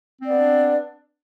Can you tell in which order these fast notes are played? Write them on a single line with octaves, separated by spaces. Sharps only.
C4 D5 B3 D4